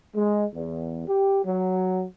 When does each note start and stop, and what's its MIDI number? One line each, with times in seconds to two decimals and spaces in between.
0.15 0.45 56
0.54 1.04 40
1.07 1.40 67
1.44 2.04 54